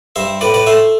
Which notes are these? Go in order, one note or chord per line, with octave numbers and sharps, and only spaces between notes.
G2 C5 E5
A2 B4 D5
B4 D5
A3 C5 E5